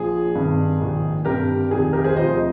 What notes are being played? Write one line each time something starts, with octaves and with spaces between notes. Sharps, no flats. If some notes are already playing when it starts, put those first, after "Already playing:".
Already playing: A#1 F3 G#4
G#1 G2 D#3
A#1 G#2 D#3
G#1 G2 D3 G4 A#4
F1 F2 D#3 G#4
G#4
G4 A#4
G#4 C5
D2 C3 F3 C5 D#5